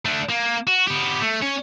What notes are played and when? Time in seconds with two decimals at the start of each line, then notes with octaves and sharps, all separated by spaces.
0.05 A3 D4
0.29 A#3
0.67 F#4
0.87 B3 G4
1.22 A3
1.42 C#4